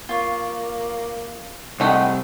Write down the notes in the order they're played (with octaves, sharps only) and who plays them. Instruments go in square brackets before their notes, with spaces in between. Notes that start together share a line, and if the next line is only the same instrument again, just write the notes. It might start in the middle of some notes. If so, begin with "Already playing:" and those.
[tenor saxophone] A#3 [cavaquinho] F4 C#5
[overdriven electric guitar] C2 [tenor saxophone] C3 [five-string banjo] G#3 A3 D#4 [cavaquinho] F#5 G5